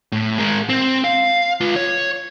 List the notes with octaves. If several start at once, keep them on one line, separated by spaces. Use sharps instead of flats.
A2
G#3 A#4
C4
F5
F4 B4
C#5